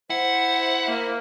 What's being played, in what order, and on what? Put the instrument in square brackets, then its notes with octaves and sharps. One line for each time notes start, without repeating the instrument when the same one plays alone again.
[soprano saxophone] E4 [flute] C5 [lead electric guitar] F#5
[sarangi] A#3